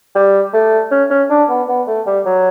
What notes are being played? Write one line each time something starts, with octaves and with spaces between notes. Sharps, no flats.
G3
A3
C#4
C#4
D4
B3
B3
A3
G3
F#3